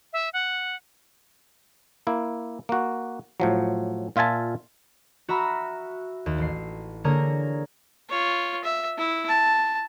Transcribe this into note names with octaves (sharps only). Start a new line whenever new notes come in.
E5
F#5
A#3 E4
A#3 F#4
A2 F3 F#3
A#2 F4 E5 G#5 A5
F#4 E5 A#5 B5 E6 F6
D#2
A1 C7
D3 A#3 G#4 A#4 C#5
F4 C#5
E5
E4
A5